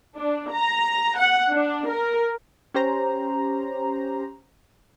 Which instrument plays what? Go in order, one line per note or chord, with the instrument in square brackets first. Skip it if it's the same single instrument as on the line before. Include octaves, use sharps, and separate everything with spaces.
[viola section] D4
A#5
F#5
D4
A#4
[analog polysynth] C#4 G4 C5 A#5